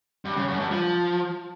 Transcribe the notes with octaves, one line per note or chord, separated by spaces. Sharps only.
G2
C#3
F#2
G2
F3